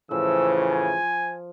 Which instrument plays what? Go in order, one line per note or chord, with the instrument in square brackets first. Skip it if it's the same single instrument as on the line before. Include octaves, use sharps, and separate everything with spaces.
[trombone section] A2 C#3 E3 [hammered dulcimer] F3 [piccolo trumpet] E6
[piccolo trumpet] G#5